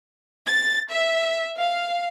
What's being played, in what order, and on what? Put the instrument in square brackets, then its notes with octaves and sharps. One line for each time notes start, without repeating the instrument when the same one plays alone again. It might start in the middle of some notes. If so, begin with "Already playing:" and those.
[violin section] A6
E5
F5